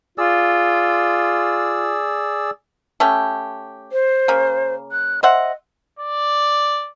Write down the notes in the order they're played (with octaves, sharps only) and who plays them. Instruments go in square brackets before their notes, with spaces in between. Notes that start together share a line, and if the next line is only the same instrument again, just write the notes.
[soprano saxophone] F4 [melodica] G#4 D5 E6
[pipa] A3 C#4 G4
[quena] C5
[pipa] C#3 A#3
[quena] F#6
[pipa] C5 E5 F#5 [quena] D#5
[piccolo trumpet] D5